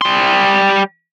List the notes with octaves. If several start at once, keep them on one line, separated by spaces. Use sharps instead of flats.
G3 C6